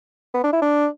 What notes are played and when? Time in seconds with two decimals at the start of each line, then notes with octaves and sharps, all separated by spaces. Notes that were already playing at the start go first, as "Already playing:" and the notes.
0.34 B3
0.44 D4
0.53 E4
0.62 D4